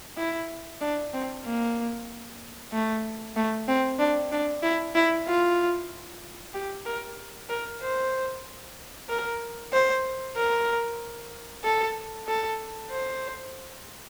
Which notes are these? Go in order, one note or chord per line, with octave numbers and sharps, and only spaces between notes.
E4
D4
C4
A#3
A3
A3
C4
D4
D4
E4
E4
F4
G4
A#4
A#4
C5
A#4
C5
A#4
A4
A4
C5